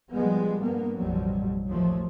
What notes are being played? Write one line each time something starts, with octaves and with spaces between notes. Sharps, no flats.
F3 G3 G#3 B3
G2 A#3 B3
A1 F2 B2 F#3 G3
D#2 F3 F#3 A3